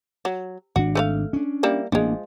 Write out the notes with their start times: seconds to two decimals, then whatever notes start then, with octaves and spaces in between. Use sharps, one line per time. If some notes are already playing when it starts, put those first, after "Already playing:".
0.25 F#3
0.76 G#1 D3 D4 F#4
0.95 A3 B4 F5
1.33 C#4 D4
1.63 G3 A#3 E4
1.92 A1 F3 G#3 A#3 D4